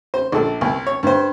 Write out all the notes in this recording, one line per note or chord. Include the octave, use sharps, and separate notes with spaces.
C5
A#1 A4
C2
C#5
G2 C5